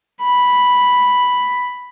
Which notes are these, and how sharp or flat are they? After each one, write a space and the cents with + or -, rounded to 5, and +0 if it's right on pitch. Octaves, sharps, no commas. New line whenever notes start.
B5 +0